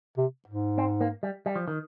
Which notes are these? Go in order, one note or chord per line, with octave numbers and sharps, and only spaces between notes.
C3
G#2
C4
A#3
G3
G3
F3
D#3